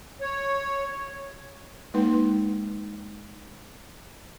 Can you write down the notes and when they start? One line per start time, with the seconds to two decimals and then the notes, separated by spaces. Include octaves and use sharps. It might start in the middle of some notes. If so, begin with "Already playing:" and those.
0.21 C#5
1.94 G#3 A#3 D#4 B4